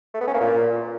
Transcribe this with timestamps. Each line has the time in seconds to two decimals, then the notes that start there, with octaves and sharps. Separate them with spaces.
0.14 A3
0.21 B3
0.27 C#4
0.34 A#3
0.41 A#2